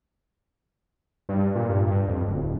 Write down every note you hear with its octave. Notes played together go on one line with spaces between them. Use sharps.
G2
A#2
G2
G2
F2
D1